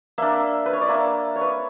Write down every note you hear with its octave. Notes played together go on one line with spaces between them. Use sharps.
A#3 D4 E5
B4
C#5
D5
A#3 D4 E5
C#5
B4